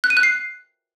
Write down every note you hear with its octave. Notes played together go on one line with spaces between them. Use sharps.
F#6
D#7
F#6
C7